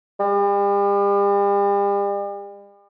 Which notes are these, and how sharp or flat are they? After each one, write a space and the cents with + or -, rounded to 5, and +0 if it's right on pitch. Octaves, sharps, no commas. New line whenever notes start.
G3 +40